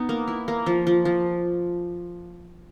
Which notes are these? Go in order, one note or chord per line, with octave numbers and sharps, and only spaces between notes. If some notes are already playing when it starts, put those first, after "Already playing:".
Already playing: B3 D#4
A#3
E4
A#3
F3
F3
F3